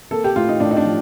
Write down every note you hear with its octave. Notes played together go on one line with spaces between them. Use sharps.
A#3 A4
G4
A2 F4
D#4
A2 D4
D#4
D4
F3